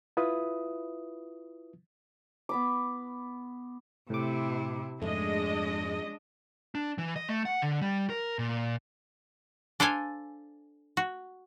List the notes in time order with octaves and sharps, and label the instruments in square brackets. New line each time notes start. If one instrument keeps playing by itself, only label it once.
[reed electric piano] E4 F4 B4 E5 D#6
[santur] B3 B5 D6
[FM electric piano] A2 D6 [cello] C3 E4
[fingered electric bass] F2 G#2 [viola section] G#3 D#5 [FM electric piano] A3 [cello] D4
[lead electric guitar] D4
E3
D#5
A3
F#5
D3
G3
A#4
A#2
[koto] D4 A4 C5 F5 G#5
F#4